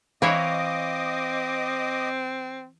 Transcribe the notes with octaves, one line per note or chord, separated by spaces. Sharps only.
E3 C4 E4 C#5 D#5 F5 D6 D#6